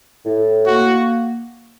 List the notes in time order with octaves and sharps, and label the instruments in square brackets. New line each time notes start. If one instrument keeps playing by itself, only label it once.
[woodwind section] A2
[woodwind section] A#3 [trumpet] F#4